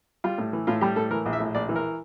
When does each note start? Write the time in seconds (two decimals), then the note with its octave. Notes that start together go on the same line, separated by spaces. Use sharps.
0.24 G3 F4
0.38 A2
0.53 E3
0.67 A2 F4
0.81 G3 G4
0.96 A2 A4
1.11 E3 A#4
1.26 A#1
1.33 E5
1.40 A2
1.55 A#1 D5
1.69 E3
1.76 A#4